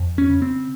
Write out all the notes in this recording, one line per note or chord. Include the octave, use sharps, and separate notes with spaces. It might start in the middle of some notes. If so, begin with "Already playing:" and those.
Already playing: F2
C#4
C#3
C4